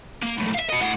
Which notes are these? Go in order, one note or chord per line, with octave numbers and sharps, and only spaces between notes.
A#3
B1 A2
E5 F5
F#4 D#5
A2 F#5